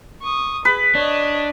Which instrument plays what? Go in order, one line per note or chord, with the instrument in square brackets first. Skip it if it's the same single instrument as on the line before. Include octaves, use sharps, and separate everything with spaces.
[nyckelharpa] C#6 D#6
[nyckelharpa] G#4 [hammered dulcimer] B4
[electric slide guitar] D4 [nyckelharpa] C#5 D#5